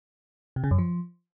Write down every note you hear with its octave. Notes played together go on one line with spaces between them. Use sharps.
C3
C#3
F#2
F3